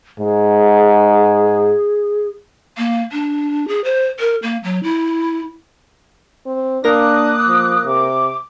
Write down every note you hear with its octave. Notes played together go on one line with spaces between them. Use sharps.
G#2 G#4
A#3
D4
G#4
C5
A#4
A#3
F#3
E4
C4
A#3 D4 A#4 D6 D#6 F#6 A#6
F3
C3 D6